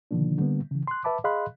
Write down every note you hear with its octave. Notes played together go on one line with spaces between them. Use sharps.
B2 D3 D#3 F3 A#3 D4
D3 G3 A#3 B3
C#3 E3
C6 F#6
B4 E5 A5 B5 D6
G#4 D#5 F5 B5 C6 F#6